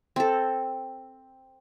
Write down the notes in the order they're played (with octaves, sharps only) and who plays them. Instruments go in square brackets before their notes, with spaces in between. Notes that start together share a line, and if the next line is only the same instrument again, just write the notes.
[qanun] C4 A4